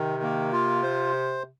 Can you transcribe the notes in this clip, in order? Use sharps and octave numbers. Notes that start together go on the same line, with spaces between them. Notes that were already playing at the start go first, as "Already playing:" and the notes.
Already playing: C3 D#3
A#3
F4
C5